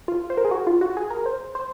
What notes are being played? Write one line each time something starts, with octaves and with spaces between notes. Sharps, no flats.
F4
C5
A#4
G#4
F#4
F4
F#4
G#4
A#4
C5
C5